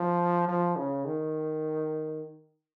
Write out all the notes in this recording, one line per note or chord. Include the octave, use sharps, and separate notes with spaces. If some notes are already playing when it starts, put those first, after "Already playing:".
Already playing: F3
F3
C#3
D#3